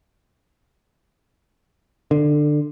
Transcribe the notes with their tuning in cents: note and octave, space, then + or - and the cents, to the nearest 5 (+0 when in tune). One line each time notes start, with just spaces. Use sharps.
D3 +20